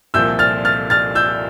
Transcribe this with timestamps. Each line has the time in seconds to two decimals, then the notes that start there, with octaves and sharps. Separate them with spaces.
0.14 C2 A#2 F3 E6 G6
0.39 F6 A6
0.65 F6 A6
0.90 F6 A6
1.15 E6 G6